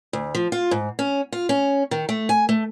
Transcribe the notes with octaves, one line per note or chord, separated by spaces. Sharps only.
D2
F3
F4
G#2
C#4
F4
C#4
D#3
A3
G#5
A3